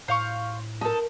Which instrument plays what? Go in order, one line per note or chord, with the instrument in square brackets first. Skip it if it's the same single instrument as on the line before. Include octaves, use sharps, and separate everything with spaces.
[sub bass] A2 [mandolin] C5 F5 C#6
[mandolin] D#4 A4 [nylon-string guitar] A#4 A5